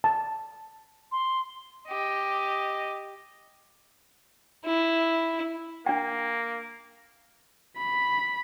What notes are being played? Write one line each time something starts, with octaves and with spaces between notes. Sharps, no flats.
A5
C6
G4 D#5
E4
A#3 D4 G5
B5